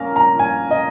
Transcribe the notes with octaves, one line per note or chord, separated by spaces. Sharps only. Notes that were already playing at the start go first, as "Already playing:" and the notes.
Already playing: A#3 C#4 A#4 F5 A#5
A#5
G#5
D#5